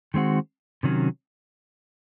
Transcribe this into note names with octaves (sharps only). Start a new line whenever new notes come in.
D#3 G#3 C4 F#4
C3 D#3 F#3 C#4